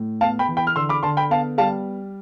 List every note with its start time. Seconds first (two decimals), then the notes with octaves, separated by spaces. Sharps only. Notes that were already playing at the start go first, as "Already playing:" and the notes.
Already playing: A2
0.21 B3 F5 A5
0.39 G5 B5
0.48 E3
0.57 G5 B5
0.67 F6
0.76 D3 C6 E6
0.89 B5 D6
1.03 D3 A5 C6
1.17 G5 B5
1.30 B3 F5 A5
1.58 G3 F5 A5